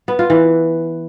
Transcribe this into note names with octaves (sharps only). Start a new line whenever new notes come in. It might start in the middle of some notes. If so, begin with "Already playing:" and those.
B3
F4
E3